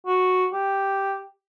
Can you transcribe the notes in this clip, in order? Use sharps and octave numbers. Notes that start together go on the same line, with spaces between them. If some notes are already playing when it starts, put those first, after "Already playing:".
F#4
G4